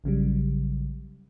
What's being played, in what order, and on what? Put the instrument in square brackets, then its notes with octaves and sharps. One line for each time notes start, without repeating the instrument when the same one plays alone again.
[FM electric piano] A#1 C#3 F#3 G3